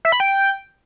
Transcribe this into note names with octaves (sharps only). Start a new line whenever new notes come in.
E5
B5
G5